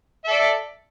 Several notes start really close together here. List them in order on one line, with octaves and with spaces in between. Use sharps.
E5 A4 D5